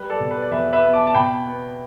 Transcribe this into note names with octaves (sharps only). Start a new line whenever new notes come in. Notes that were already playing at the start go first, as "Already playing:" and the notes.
Already playing: G3 B4
A4 D5
B2
B4
D5
E2 B4 E5
B4 E5
B3
A5 D6
A5
B2 G5 B5
B3